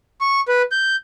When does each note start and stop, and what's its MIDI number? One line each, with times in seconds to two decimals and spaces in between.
0.21 0.41 85
0.48 0.62 71
0.72 0.96 91